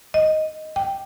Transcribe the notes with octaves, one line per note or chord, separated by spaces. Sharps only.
D#5
G5